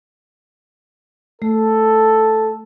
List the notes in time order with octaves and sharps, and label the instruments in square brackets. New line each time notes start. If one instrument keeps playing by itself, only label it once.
[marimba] A3 [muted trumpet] A4